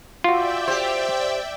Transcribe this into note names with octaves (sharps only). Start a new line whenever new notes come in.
F4 F#4 D5 E5 G5
G4 C5